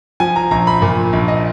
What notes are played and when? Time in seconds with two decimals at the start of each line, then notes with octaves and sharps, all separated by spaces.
0.20 F3 G#5
0.36 A#5
0.51 A#1 A#5
0.67 B5
0.82 A#2
1.13 A#1
1.28 D#5